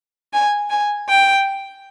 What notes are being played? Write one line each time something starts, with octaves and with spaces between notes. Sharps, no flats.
G#5
G#5
G5